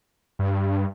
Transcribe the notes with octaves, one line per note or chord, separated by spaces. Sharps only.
G2